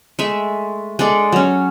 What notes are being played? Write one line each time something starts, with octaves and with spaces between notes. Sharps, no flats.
G#3 A3 E5
G#3 D4 A4 D5
F#3 C#4